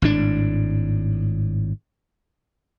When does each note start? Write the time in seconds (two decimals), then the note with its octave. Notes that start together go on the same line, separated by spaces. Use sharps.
0.02 G#1 A2 D4